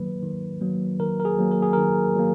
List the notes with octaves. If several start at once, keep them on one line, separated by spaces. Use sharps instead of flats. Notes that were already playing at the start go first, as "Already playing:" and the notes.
Already playing: D#3 F#3 A#3 B4
D#3
F#3 A#3
D#3 A#4
A#4
G#4
F#3 A#3
A#4
G#4
D#3 A#4
F#3 A#3